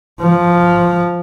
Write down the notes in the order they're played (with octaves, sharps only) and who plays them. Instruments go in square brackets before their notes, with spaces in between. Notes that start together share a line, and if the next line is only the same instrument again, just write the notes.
[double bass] F3